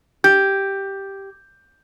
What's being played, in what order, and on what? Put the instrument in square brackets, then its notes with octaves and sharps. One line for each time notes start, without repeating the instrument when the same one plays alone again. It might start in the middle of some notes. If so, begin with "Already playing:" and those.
[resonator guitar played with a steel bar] G4 [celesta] G6